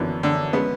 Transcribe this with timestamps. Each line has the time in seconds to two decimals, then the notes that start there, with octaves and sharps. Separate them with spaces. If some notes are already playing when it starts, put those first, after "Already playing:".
Already playing: F#2 D3 E3 B3
0.23 D3
0.53 G#3 B3 C#4